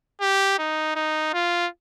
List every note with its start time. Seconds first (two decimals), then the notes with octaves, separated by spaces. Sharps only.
0.21 G4
0.59 D#4
0.96 D#4
1.34 F4